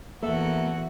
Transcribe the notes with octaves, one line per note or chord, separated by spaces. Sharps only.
E2 A#3 F#4 A4 E5